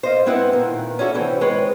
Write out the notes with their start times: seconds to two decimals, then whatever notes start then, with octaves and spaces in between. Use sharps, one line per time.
0.03 C5 D#5 F5
0.26 G#3 B3 C4 E4 B4 F#5
0.53 A#2 D#3
0.99 C#4 D4 E4 F#4 G#4 A4
1.14 C3 E3 C4 C#4
1.41 D#3 G#3 C4 B4 C#5